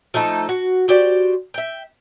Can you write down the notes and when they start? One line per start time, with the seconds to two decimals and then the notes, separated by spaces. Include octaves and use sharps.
0.14 F3 A3 D#4 A4
0.49 F#4
0.88 F#4 G4 C5 D5
1.54 E5 G5